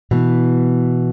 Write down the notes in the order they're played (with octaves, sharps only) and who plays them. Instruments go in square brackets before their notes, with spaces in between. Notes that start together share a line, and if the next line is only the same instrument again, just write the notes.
[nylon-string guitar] B2 E3